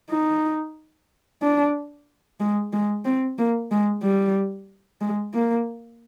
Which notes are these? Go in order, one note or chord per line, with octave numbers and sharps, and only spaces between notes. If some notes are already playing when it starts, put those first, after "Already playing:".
D#4
D4
G#3
G#3
C4
A#3
G#3
G3
G#3
A#3